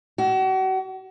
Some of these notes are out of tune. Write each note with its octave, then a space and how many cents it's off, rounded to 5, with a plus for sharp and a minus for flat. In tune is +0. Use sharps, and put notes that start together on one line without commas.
F#4 +40